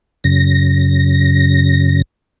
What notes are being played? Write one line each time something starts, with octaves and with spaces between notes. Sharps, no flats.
F#2 C#3 A#6